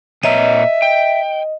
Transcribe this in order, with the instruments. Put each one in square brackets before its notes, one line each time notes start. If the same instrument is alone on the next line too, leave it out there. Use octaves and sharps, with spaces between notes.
[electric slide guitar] A#2 C#5 A#5 [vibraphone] D#5 [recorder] E5
[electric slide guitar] G5